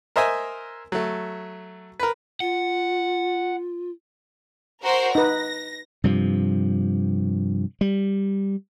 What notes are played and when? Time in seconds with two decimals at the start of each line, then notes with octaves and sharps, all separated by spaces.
0.16 A#4 C5 D#5 E5 G#5
0.92 F#3 A3
2.00 A#4 B4
2.40 F4 F#5
4.83 F#4 A#4 C5
5.15 D#4 B4 A#6
6.04 G2 C3 F3
7.81 G3